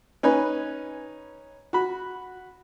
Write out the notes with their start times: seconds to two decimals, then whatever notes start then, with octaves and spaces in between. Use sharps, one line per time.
0.23 C#4 D#4 B4 G#5
1.73 F#4 B5